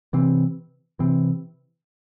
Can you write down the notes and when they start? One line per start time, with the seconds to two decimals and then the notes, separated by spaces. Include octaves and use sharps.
0.13 C3 E3 C4
0.99 C3 E3 C4